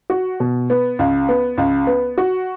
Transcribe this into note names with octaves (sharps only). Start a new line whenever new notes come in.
F#4
B2
B3
C#2
B3
C#2
B3
F#4